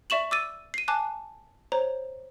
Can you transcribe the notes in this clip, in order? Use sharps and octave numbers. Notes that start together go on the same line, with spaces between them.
D5 E5 C#6 E7 F#7
D6 E6 A6 D#7
C7 D#7
G#5 A5 D6 F#6
C5 C#5 A#5